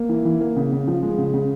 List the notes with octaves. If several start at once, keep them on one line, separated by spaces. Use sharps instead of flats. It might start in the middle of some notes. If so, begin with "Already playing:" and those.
Already playing: A#3
E3
E3
A#3
C#3
C#3
F3
G#3
C#3
C#3